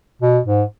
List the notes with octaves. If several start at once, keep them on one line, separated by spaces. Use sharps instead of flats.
B2
G#2